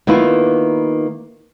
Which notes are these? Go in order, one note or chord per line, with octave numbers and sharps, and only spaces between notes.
D#3 A#3 B3 E4 F4